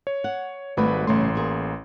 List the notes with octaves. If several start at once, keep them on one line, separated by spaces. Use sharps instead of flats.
C#5
F#5
G#1 G3 A3 F#4 B4 B5
A1 G2 C#3 A3 C6
A#3 G#4